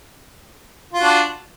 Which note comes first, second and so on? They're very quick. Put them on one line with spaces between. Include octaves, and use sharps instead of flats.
F4 F#4 D4